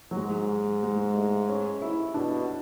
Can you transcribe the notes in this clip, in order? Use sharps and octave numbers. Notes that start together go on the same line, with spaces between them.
F#3
G#2 G#3
G#3
A3
C#4
E4
B2 D4